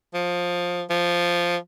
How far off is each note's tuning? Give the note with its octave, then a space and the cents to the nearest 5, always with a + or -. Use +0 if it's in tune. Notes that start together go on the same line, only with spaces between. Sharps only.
F3 +15
F3 -5